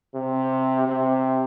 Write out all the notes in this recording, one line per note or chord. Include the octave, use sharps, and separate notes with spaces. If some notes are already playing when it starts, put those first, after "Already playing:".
C3
C3